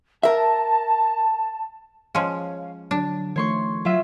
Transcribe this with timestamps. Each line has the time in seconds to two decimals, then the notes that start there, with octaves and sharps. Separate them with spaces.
0.23 A#4 E5 A5
2.15 F3 G#3 C#4 C#5 F5
2.91 D3 F#3 D4
3.36 D#3 F3 A3 C#5 C6 C#6
3.85 F#3 F4 E5